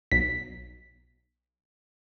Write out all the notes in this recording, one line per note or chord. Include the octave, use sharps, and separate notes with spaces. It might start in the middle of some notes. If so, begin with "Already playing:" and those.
B1 B6